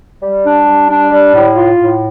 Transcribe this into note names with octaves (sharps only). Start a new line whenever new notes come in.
G3
D4
G3
D4
G3
A2
F4
A2